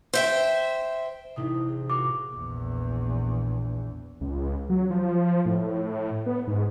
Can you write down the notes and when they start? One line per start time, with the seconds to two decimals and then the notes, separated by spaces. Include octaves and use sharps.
0.14 C5 E5 G5
1.36 A1 A2 C3 D#4 E4 D#6
1.69 G#4
1.90 F4 F#4 A#4 D6
2.32 A#1 E2
4.21 C#2
4.70 F#3
4.90 F3
5.46 A2
6.26 B3
6.47 G#2